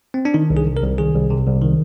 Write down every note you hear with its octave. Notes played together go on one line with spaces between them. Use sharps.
C4
D4
D#3 D#4
C2
G#4
C3
A#4
C2
D#3 G#4
C2
C3
C2
D#3